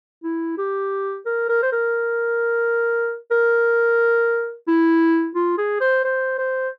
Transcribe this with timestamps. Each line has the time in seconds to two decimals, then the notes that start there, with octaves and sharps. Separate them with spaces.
0.24 E4
0.58 G4
1.26 A#4
1.49 A#4
1.62 C5
1.72 A#4
3.31 A#4
4.68 E4
5.35 F4
5.58 G#4
5.81 C5
6.04 C5
6.38 C5